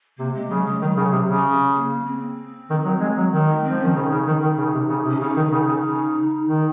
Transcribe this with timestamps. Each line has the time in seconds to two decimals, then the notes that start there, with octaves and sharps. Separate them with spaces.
0.18 C3 A#3
0.34 G#3
0.49 C#3 F#3
0.66 G#3
0.81 D#3 F#3
0.97 C#3
1.12 C3
1.28 C#3
1.75 A#3
2.06 C4
2.70 D#3
2.85 F#3
3.01 G#3
3.17 F#3
3.32 D#3
3.48 G#3
3.64 C4
3.70 F3
3.80 D#3 C#4
3.95 C#3 D#4
4.11 C#3
4.27 D#3
4.42 D#3
4.58 C#3
4.74 C3
4.89 C#3
5.05 C3
5.09 C#4
5.21 C#3 D#4
5.37 D#3
5.52 C#3
5.68 C#3
5.83 C#3
6.46 D#3